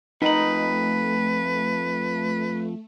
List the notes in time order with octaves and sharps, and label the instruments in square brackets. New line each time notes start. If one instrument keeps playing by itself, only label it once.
[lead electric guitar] F2 B5 [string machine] A3 [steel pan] D#4 [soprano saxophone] B4